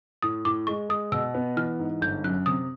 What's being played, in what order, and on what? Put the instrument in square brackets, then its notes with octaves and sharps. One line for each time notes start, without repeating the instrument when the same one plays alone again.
[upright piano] A2 [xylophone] D#6
[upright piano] A2 [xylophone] D6
[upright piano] G#3 [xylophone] C#6
[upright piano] G#3 [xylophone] D#6
[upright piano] B2 [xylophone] E6
[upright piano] B3
[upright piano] E3 [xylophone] F6
[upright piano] G#2
[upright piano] G1 [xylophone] G6
[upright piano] F#2 [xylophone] F#6
[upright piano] C3 [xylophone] D#6